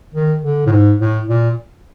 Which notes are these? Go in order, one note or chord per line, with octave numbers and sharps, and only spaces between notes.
D#3
D3
A2
G#2
A2
A#2